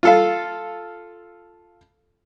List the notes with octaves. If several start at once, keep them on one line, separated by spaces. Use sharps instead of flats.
F4 A4 F5